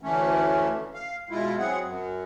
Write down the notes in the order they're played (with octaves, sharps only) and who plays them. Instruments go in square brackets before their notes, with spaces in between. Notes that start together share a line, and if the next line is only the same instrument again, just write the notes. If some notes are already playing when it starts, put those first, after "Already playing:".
[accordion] D2 E3 A3 C#4
F5
B2 G#3 E4 F4
F#3 C4 G#4 F#5
F#2